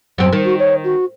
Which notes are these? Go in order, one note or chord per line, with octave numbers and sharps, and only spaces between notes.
F#2 C4
D#3
F#4
C#5
F#4